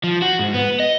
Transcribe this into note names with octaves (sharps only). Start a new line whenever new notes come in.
F3
F#4
G#2
B3
D#5